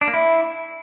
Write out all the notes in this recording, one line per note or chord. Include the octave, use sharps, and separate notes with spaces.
D4
A#3
E4